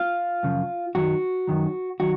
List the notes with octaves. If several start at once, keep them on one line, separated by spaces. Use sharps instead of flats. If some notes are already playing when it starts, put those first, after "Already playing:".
Already playing: F4
F#2 C#3 F3
F#2 D#3 F#3 F#4
F#2 D#3 F#3
D#3 F#3 F#4